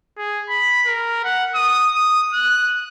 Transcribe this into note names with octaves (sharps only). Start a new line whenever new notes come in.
G#4
B5
A#4
F#5
D#6
D#6
F#6